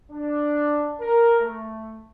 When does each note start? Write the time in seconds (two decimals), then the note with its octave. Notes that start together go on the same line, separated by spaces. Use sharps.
0.11 D4
1.00 A#4
1.40 A3